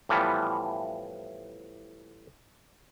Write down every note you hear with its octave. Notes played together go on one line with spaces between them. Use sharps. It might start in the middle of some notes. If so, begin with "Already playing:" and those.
A2 E3 F3 G3 B3